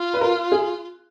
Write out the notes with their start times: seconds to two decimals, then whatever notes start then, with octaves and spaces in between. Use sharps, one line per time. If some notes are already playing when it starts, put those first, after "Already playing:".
Already playing: F4
0.14 B4
0.21 A#4
0.52 G#4